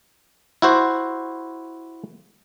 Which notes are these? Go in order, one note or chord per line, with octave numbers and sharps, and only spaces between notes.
E4 F#4 C5